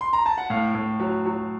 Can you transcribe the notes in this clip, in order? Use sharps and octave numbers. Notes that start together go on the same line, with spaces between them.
C6
A#5
A5
F#5
A2 F5
A2
F#3
F#3